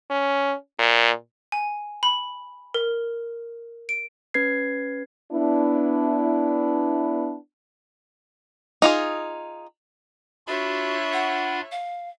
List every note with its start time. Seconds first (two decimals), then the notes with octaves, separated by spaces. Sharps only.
0.10 C#4
0.79 A#2
1.52 G#5
2.03 B5
2.74 A#4
3.89 D7
4.34 C#4 B4 G#6 C7
5.32 B3 D4 E4
8.82 D#4 F4 G#4
10.47 D4 F4 F#4 C#5 E5 B5
11.13 F#5
11.71 F5